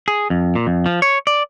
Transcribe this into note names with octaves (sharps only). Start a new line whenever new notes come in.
G#4
F2
A#2
F2
F3
C#5
D5